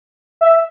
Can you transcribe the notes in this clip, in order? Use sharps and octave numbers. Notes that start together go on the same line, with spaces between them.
E5